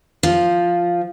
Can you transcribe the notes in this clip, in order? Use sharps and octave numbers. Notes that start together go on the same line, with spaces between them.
F3